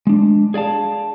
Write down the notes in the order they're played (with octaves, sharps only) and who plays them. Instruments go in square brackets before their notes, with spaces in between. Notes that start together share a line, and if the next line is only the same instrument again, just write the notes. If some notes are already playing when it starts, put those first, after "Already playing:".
[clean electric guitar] G#3 D4
G#4 D5 F5 A5